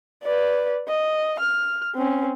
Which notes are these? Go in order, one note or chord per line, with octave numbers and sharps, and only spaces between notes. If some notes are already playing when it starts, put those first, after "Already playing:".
B4 D5
D#5
F6
C4 C#4